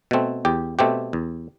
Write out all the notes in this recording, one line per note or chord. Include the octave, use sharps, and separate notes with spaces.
B2 A3 C4
E2 G4
B2 A3 C4 G4
E2